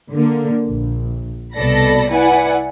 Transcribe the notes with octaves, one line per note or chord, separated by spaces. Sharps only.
D3 A#3
A#1
C2 B2 A4 D5 B5 A#6
E4 B4 D5 F#5 G#5